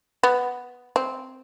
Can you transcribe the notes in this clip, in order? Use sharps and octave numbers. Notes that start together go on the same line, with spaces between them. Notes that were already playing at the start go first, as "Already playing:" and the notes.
B3
C4